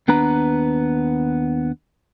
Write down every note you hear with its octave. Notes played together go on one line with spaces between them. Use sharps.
D#2 B3 D4 B4 A#5